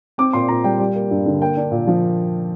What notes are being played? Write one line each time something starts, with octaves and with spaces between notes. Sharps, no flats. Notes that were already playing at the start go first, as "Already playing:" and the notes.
C4 D6
A#2 C6
A#2 A#5
G3 G5
G3
A#3
G2
D3
A#3 G5
D4
A#2
F3